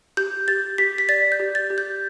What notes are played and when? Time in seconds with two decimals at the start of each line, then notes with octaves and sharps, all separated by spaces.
0.17 G4 G6
0.48 G4 A6
0.78 G4 B6
0.98 B6
1.09 D5 A6
1.32 G6
1.40 G4
1.55 A6
1.70 G4
1.78 G6